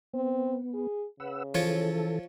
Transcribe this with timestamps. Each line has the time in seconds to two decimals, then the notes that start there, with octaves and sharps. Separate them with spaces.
0.14 B3 C4
0.74 G#4
1.20 C#3 B4 F#5 E6
1.54 E3 F3 F4 A4 C#5